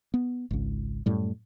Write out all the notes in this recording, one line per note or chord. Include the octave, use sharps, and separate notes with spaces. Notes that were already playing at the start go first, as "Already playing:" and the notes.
B3
G#1 C#2
F#2 A2 G3